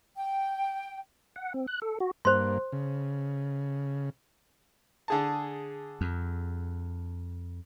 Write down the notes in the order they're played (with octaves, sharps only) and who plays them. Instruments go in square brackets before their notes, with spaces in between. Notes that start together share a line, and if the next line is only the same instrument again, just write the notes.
[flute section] G5
[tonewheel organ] F#5
C4
F#6
A4
F#4
[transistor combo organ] G2 A#3 [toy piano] C5 C6
[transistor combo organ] C#3
[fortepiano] D3 G#4 A5
[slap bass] F2